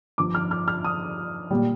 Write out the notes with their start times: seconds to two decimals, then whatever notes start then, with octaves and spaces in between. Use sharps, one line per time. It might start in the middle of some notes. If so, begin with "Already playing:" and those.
0.18 G2 F3 D6
0.35 F6
0.51 F6
0.68 F6
0.84 D#6
1.51 A#2 G3